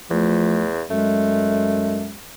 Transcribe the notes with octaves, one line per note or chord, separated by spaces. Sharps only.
E2 F3 A3
F#2 G#3 A3